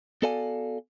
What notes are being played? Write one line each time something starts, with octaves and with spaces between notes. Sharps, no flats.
B3 F#4 A4 D5 F5 G#5